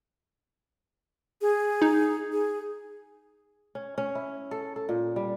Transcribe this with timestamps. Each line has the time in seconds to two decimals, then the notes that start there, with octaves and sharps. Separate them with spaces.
1.41 G#4
1.82 D#4
2.32 G#4
3.75 C#4
3.98 C#4
4.15 E4
4.51 A4
4.76 A4
4.89 A#2
5.16 G3